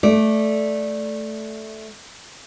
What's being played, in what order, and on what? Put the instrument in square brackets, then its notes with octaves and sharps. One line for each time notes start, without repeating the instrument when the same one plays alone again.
[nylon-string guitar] A3 D5